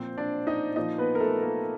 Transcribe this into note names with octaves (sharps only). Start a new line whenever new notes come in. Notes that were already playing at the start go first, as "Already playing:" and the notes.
Already playing: A#2 F3 C4 C5
D4 D5
D#4 D#5
A#2 F3 D#4 D#5
B3 B4
A#4
A3 A4
A#3 A#4